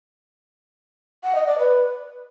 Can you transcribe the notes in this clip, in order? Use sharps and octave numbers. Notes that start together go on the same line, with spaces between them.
F#5
D#5
D5
B4